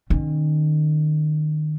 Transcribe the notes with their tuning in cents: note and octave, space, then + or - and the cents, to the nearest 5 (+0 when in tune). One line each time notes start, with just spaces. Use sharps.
D#3 -30 C#4 -45